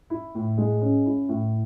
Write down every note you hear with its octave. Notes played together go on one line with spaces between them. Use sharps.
E4
A2
G#3
C#4
E4
A2